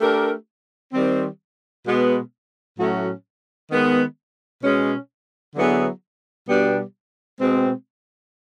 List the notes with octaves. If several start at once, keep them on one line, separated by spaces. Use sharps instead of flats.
A3 D4 G4 A#4
D#3 G3 C4
B2 G#3 B3
A2 F#3 A3 C#4 F#4
D#3 G#3 B3
B2 G#3 C#4
D3 F#3 B3 E4 G#4
B2 G3 B3 D4 G4
B2 G#3 C4